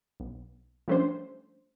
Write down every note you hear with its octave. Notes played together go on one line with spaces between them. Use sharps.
B1
F3 G3 A3 C#4 D4 C5